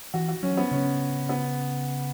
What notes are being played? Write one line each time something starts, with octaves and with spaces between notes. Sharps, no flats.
E3 F#4
F#4
F#3 C#4
B3
C#3 C#4
B3